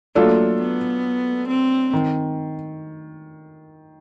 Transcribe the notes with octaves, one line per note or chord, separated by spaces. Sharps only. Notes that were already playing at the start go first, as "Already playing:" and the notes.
F#3 A3 A#3 D4 F4 A4
B3
C4
D#3